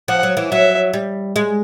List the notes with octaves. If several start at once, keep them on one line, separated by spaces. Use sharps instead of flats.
F3 F#5
F#3
E3
F#3 E5
G3
G#3